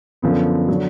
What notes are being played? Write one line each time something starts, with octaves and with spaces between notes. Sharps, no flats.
F#2 D3 F3 B3
D3 F#3